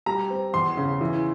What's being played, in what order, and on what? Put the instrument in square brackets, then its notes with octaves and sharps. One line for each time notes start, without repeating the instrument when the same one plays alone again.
[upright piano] G3 A#5
C4
E2 C6
C#3
E3